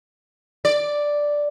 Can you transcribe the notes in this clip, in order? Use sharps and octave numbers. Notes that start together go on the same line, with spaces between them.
D5